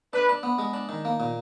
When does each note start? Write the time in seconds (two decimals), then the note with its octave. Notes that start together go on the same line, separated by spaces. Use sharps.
0.13 D4 B4
0.29 D4
0.43 B3
0.58 G#3
0.73 D4
0.89 D#3
1.05 A#3
1.20 A#2